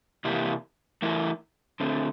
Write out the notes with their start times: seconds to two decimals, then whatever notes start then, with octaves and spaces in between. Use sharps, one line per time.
0.25 C3 E3 A#3 E4 G4
1.02 E3 A3 E4 A#4
1.80 D3 A3 C4